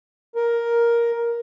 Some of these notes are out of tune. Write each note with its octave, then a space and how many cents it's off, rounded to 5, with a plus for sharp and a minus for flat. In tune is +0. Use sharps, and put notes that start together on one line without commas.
A#4 +10